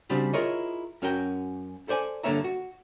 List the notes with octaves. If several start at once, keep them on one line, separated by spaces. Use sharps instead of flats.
C#3 G3 C4 D4 F#4 G4
E4 F4 G#4 A#4 C#5 D#5
F#2 C#4 F#4 A#4 G5
A4 C5 D5 G#5
G2 D3 A#3 C#5 E5 A#5
F#4